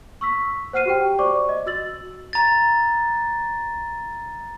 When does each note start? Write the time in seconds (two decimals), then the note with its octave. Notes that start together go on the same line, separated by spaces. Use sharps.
0.21 C#6 E6 B6
0.73 C5 F#5 F6 C7 D#7
0.85 F#4 G4 G5
1.19 C5 D5 C#6 D6
1.49 D#5
1.66 F#4 E6 A6 F#7
2.33 A#5 A6